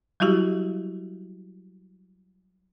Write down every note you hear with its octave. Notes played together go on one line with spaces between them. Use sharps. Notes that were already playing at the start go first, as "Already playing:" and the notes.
F#3 G3 E4 F#4 G4